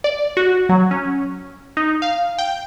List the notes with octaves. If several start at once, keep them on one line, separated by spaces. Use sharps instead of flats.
D5
F#4
F#3
C#4
D#4
F5
G5